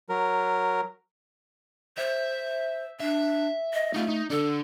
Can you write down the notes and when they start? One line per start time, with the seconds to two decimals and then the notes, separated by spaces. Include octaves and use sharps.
0.09 F#3 A#4
1.98 C5 E5
3.00 D4 E5
3.74 D#5
3.94 A3 D#4 F4
4.08 D#4
4.30 D3 D4 A4